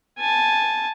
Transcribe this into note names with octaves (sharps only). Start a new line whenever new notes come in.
G#5 A5